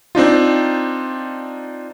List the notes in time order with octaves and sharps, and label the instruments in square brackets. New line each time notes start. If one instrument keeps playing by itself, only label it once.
[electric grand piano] C4 D4 D#4 F4